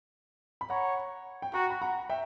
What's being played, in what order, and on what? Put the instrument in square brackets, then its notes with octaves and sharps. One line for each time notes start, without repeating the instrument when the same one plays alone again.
[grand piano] B5
[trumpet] C#5 [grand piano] F#5 A#5
[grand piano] G5
[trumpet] F#4 [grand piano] F#5 A#5
[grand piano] B5
F#5 A#5
E5 G5